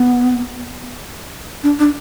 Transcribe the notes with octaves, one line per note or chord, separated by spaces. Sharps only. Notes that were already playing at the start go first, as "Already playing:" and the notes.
Already playing: B3
D4
D4